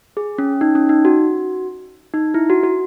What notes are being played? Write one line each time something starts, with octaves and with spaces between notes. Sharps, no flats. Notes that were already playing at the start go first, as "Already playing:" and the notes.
G#4
C#4
D#4
C#4
D#4
F#4
D#4
E4
F#4
F#4